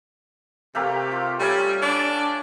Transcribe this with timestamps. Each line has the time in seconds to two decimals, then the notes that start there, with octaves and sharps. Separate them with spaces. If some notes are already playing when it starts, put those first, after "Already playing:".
0.75 C3 A3 A#3 G4
1.11 F4
1.39 G3 A3 C#4 G#5
1.82 D4